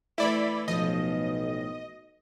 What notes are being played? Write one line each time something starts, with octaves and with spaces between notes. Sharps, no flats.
E3 A3 E4 D5 B5
B1 A2 F3 D#5